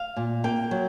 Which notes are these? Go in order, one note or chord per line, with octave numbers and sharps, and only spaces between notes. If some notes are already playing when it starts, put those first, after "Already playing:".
Already playing: F5
A#2
A#3 G5
F#3